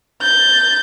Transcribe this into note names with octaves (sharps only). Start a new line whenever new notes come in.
G6 A6